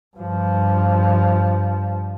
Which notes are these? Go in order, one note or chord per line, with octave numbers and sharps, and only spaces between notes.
G2 F3